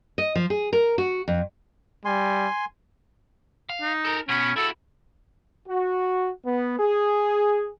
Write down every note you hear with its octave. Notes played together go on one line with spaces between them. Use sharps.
D#5
F3
G#4
A#4
F#4
F2
G3 G#5 C6
F5
D#4
A4 A#4
B2 B3 C#4
E4 F#4 A4
F#4
B3
G#4